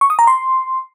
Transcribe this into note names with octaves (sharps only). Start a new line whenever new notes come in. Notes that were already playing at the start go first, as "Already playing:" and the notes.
C#6
D#6
A#5
C6